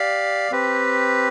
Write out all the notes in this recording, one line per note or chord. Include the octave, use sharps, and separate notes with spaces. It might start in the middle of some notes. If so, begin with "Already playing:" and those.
Already playing: G4 D5 F5
C4 G4 B4